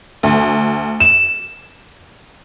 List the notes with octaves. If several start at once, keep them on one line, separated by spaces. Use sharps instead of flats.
D2
E7